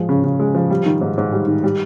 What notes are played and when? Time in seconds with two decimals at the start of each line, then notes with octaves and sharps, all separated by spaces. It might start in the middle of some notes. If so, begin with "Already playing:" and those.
Already playing: F3 G#3
0.09 C#3
0.24 C#3
0.40 G#3
0.55 F3
0.70 G3
0.86 D#3
1.01 G#2
1.18 G#2
1.32 G3
1.47 D#3
1.63 G3